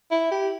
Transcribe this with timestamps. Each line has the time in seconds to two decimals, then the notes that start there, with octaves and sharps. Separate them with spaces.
0.11 E4
0.31 G4